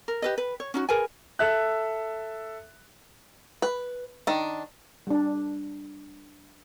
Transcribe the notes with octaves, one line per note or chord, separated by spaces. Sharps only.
A#4
G4 B4 D#5
B4
C#5
C#4 D#4 F#4
G#4 A#4 B4 G#5
A4 E5 F#6
B4
D#3 D4
G3 D4